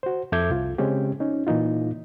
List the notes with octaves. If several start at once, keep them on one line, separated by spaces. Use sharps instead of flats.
F#4 C5
F2 A4 E5 D6 G6 G#6
C2 F4
C#3 G#3 C4 C#4 G4
C#4 D#4
A#2 E3 A#3 D#4 F4